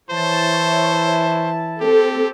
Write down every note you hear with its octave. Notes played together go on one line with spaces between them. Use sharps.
E3 E4 C5 C#5 A5
C4 G4 A4